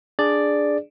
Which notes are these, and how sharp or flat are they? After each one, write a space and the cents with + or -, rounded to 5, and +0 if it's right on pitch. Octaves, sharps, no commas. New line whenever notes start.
D4 +0 G#4 +0 D5 +5